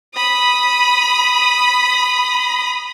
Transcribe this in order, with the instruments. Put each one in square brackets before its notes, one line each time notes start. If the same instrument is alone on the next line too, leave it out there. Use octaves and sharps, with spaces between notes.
[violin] B5 D#6